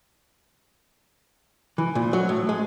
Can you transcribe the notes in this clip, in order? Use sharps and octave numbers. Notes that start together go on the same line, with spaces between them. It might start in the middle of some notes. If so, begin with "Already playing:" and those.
E3
A#2
F#3
A2
G#3